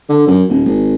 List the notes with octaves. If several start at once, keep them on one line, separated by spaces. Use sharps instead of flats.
D3
F#2
D#1
G#1